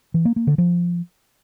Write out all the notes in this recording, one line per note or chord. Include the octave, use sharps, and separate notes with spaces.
E3
A#3
A#3
D3
F3